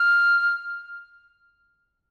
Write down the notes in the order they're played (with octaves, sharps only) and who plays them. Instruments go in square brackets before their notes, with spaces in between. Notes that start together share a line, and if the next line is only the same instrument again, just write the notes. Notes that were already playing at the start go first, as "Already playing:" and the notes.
Already playing: [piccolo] F6